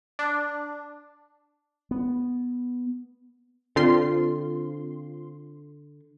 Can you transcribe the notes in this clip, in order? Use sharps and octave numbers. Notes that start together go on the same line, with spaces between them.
D4
B3
D3 C4 F4 C6